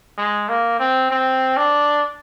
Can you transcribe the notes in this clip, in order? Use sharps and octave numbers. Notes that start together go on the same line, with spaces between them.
G#3
A#3
C4
C4
D4